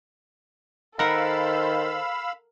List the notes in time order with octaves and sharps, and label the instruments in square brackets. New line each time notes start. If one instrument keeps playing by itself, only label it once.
[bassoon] D#3 [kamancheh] A4 C5 [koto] A#4 F#5 [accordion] F5 B5 E6